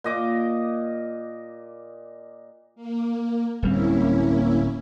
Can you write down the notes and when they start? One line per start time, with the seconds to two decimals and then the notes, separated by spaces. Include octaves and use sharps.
0.04 A#2 D#5 D6
2.76 A#3
3.62 D1 G3 A#3 C4 C#4 E4